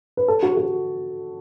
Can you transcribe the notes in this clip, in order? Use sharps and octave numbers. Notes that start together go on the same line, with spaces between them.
B4
A4
F#4
F#4